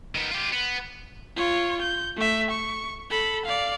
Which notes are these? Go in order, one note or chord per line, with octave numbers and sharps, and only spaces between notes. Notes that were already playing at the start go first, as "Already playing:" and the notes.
D#3 B3
F4 G4
B3
F4 C#5
G6
A3 E5
C#6
A4 B5
D5 F5